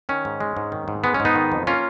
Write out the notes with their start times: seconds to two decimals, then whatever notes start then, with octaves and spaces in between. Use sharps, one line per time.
0.09 D#3 C#4
0.25 G#2
0.40 G#3
0.57 G#2
0.72 D#3
0.88 G#2
1.04 G#3 B3
1.14 C#4
1.20 G#2
1.25 B3 D#4
1.36 D#3
1.52 F2
1.67 A#3 C#4 F4